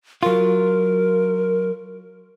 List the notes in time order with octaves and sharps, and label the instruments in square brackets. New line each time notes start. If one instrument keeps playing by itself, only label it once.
[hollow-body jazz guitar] F#3 F4 [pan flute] A#4